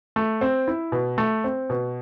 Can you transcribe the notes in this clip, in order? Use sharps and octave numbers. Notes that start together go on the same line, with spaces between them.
A3
C4
E4
B2
A3
C4
B2